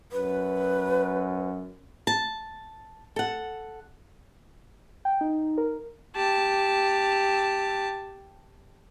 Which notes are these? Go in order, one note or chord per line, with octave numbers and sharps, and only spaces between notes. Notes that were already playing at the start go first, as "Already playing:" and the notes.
F#2 B4
A5
A4 F#5
G5
D#4
A#4
G4 A5